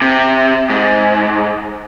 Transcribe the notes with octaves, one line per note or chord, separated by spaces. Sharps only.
C3
G#2